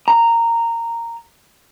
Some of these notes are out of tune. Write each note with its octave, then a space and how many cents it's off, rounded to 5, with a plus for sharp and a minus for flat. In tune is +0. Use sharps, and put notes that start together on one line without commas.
A#5 -10